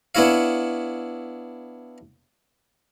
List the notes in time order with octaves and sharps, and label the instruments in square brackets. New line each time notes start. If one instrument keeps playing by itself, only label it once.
[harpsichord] B3 D4 E4 C#5 F5